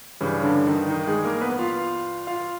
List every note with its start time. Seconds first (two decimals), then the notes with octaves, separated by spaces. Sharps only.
0.21 G2 C#3 E3 G3 C#4
0.43 D3 D4
0.67 D#3 D#4
0.89 D#3 D#4
1.07 G#3 G#4
1.24 A#3 A#4
1.41 B3 B4
1.59 F4 F5
2.27 F4 F5